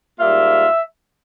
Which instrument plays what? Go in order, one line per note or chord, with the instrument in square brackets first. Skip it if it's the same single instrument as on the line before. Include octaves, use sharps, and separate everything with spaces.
[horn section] G#2 G3 A#3 F4 E5